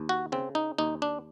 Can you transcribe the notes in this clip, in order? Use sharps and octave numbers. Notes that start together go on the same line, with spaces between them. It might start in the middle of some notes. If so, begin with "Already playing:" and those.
Already playing: D#2
F#4
C#3 C4
D#4
D#2 D#4
D4